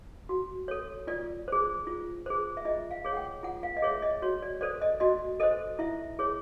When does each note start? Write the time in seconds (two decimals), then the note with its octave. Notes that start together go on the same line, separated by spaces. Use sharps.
0.29 F#4
0.68 A4 C#5
1.07 F4 D5
1.48 G#4 C5
1.87 F4
2.26 G#4 C5
2.57 E5
2.65 F4 D#5
2.91 F5
3.05 G#4 C#5
3.13 F#5
3.17 G5
3.43 F4 F#5
3.63 F5
3.77 D#5
3.82 G#4 C#5 E5
4.02 D#5
4.22 F#4 C#5
4.42 D5
4.61 A4 C5 D5
4.82 D#5
5.00 F#4 D#5
5.40 A4 C5 D#5
5.79 E4 E5
6.19 G#4 C#5